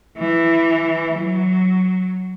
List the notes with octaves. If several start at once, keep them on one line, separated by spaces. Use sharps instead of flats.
E3
F#3